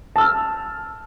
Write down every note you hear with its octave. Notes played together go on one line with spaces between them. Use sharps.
A5 E6 F6